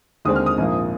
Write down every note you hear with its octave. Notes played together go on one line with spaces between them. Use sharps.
D#2 D3 G#3 C4 D#6
F6
D#6
A#1 G#2 F3 A#3